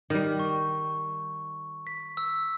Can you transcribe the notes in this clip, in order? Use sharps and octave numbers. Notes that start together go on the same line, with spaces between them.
D#3 G3
C#6
B6
E6